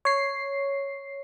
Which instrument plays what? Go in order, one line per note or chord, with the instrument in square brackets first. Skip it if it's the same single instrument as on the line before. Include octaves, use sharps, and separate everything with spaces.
[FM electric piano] C#5 C7